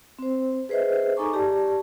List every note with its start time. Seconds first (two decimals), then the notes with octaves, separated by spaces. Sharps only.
0.19 C4 C5
0.69 G#4 B4 C5 D#5 E5
1.17 D#4 A4 G#5 A#5 C#6 D6
1.34 G4 D5 A5